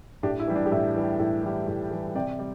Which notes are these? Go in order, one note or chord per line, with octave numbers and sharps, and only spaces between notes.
A2 D4 G4
E4
E3 G3
D4
G4
A2 E4
E3 G3
A2 E4
E3 G3
A2 E4
E3 G3
C3 D5 G5
G3 D5